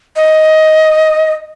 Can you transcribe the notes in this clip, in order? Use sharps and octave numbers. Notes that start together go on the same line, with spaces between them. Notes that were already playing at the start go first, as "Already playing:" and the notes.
D#5